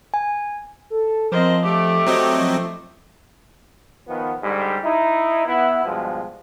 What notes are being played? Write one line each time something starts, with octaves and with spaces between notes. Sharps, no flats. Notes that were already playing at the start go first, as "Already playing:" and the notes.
G#5
A4
F3 C4 A#4 C5 D#5
A3 G4 D5
F#3 C4 D#5
F3
D#3 F3 B3
G#2 D3 G3
D#4 E4
B3 E4
G2 B2 F3 G#3